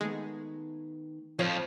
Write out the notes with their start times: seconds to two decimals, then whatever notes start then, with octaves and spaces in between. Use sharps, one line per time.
0.01 D#3 G#3 A3 B3
1.39 F2 F3 C#5 F5